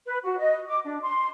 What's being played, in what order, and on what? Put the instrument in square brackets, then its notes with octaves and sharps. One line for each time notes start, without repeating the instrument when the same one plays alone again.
[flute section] B4
F#4
D#5
D6
D4
C6